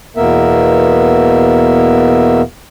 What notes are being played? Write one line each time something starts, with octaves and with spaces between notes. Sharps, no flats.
E2 B2 A#3 B3 A#4 E5